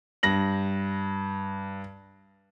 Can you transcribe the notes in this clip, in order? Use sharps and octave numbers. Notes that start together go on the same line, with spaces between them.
G2 A#6 F#7